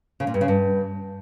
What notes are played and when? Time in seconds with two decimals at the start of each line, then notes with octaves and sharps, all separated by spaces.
0.20 C#3
0.27 A#2
0.34 G2
0.41 C#3
0.48 G2